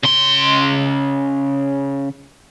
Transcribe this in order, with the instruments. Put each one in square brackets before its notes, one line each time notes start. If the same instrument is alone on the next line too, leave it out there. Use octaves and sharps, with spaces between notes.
[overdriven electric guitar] C#3 C6